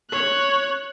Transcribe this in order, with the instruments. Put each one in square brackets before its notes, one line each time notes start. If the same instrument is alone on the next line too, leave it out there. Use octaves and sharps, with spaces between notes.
[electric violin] C#5 F#6